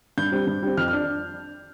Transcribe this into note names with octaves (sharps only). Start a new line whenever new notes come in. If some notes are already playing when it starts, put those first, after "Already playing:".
G2 G6
G3 C4
G2
G3 C4
F2 F6
F6
D4